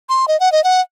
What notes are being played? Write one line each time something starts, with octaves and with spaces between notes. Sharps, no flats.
C6
D#5
F#5
D#5
F#5